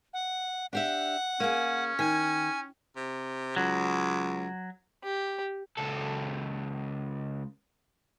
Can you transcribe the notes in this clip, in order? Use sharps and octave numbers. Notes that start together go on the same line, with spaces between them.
F#5
D4 G4 E5 F#5
A#3 C#4 G#4
D#3 G#5
C3
C#2 F#3
G4
C#2 A4